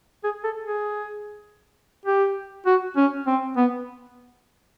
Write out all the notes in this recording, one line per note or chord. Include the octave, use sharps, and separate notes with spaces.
G#4
A4
G#4
G4
F#4
C#4
C4
B3